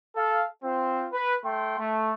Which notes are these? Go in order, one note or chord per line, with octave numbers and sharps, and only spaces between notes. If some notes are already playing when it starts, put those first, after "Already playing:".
A4 F5
C4 F4 C5
B4
A3 G5 C6
A3